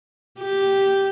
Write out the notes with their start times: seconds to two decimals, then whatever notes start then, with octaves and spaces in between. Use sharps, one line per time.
0.40 G4